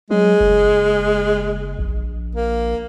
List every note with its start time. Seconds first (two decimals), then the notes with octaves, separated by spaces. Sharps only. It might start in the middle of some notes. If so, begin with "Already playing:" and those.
0.11 F#3 G#3
0.41 F#1
1.79 A#1
2.35 A#3